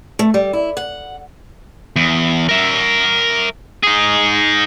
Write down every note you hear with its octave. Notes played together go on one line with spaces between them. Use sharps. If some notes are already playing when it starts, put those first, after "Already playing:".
A3
G3
E4
F#5
E2
A#4 E5
D#4 G#4